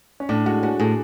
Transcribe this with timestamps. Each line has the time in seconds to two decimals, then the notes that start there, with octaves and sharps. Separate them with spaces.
0.20 C#4
0.29 A2 D4
0.46 G#3 F#4
0.63 C#4 F#4
0.80 A2 G#4